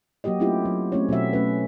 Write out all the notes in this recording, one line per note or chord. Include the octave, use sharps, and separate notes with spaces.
F#3 A#3 F#4 G4 D#5
A3 C4 C#4 E4 F4 G4
F#3
A3 C4 C#4 E4 C#5
B2 F#3 F#4 E5
A3 C#4 B4